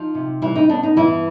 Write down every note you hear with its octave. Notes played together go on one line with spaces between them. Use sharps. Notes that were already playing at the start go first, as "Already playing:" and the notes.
Already playing: F3 D#4
C3
E3 G3 E4
D#4
B3 D4
D#4
G2 E3 E4